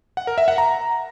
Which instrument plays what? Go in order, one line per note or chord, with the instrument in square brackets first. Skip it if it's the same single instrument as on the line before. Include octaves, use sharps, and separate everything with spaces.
[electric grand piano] F#5
A#4
E5
F#5
A#5